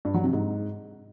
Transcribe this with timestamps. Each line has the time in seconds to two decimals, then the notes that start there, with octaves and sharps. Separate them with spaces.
0.05 G2
0.14 F#3
0.24 C3
0.33 G#2